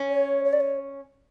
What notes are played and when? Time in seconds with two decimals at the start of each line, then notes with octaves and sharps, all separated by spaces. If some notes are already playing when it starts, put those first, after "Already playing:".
Already playing: C#4
0.10 C#5
0.44 C#5
0.52 D5
0.60 C#5